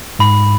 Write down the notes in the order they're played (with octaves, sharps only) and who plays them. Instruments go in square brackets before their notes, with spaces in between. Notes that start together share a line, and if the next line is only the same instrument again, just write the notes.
[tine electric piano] G#2 [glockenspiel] B5